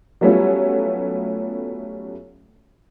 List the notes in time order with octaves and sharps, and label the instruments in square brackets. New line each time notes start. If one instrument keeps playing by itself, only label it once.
[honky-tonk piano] F#3 G3 A3 B3 C#4 F4